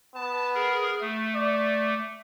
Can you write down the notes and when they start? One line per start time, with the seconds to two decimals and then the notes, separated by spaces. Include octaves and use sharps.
0.15 B3 A5
0.55 G#4 A#4
1.01 A3
1.36 D5